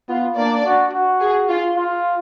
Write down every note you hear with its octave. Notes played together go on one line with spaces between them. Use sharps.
B3 F4
A#3 D4 D5
F#4
F#4
G#4
F4
F4